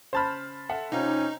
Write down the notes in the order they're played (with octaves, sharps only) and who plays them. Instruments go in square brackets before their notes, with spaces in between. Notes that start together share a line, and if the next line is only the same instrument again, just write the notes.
[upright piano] C#3 F6 [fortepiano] C5 A5 B5
[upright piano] A4 E5 F#5
[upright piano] C3 C4 F4 [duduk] C#4 [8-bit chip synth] D#4